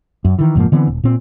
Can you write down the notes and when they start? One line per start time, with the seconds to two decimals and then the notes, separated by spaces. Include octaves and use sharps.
0.25 F#2
0.39 D#3 E3
0.55 F1 G#2 F3 A#3
0.72 D3 E3 B3 C4
0.87 D#1
1.04 A#2 C4